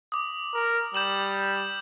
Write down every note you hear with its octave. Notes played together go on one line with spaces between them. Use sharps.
D6 D#6
A#4
G3 G6 E7 F#7